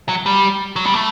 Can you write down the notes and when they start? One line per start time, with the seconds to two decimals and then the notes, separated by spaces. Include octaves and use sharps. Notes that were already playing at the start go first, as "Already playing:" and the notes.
0.09 F#3
0.26 G3
0.76 F#3
0.85 G3
0.94 A3